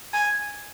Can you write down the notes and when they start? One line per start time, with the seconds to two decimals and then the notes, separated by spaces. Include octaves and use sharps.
0.14 G#5